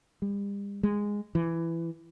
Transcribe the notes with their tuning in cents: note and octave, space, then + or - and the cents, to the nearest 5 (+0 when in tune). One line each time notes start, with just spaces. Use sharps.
G3 +40
G#3 -10
E3 +15